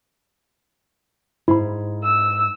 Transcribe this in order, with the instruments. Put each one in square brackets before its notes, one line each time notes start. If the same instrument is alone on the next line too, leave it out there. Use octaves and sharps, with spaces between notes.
[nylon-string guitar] G#2 [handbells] E4 B5
[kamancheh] E6